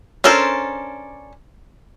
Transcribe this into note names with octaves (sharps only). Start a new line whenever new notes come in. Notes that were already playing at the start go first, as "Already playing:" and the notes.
C#4 D4 A4 A#4 C5